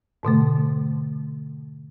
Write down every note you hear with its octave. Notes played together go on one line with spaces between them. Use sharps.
G#2 B2 D3 A3